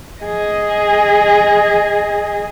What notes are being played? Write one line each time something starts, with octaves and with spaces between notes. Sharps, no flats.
G#4 D#5